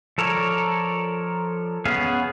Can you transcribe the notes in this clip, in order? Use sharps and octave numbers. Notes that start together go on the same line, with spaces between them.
F3 A4 A#4 C#5 D5
B3 C#4 G#4 F5